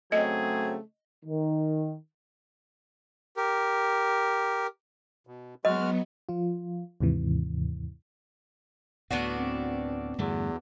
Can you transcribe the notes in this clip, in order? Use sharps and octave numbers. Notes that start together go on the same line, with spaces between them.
C#3 F#3 A3 C4 G#4 D#5
D#3
G4 A#4
B2
F#3 G#3 B3 F#4 D#5 F6
F3 F4
D#2 G#2 C3 E3
D2 A2 B3 D4 F#4
C4
E2 G2 D3 A3